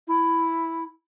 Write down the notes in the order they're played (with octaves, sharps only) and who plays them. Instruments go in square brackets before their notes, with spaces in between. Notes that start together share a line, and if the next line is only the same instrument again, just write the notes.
[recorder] E4